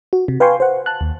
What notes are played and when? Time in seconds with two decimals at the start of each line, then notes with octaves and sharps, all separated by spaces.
0.13 F#4
0.28 C3
0.40 B4 F5 G5 G#5 C6 C#6
0.60 C5 F#5
0.86 A5 F#6
1.01 D#2